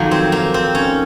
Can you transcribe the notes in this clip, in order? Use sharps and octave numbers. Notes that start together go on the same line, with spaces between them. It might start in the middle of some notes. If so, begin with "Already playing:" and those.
Already playing: F2 D#3 F#3 A#3
C4
A#3
C4
C#4